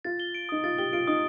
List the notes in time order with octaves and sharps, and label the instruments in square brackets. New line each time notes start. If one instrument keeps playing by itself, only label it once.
[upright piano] F4 [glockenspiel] A6
[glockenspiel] G7
D7
[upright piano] D#4 [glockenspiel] D#6
[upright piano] F4 [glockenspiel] A6
[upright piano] G4 [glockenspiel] G7
[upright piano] F4 [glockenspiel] D7
[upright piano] D#4 [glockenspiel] D#6